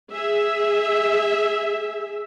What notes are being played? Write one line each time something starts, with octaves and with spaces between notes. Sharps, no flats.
G#4 E5